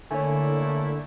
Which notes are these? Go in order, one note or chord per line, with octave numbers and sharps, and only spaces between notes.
D3 A3 A#3 E4 C#5 G#5